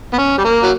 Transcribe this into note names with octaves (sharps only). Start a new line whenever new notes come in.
B3
C#4
G3
A#3
F#3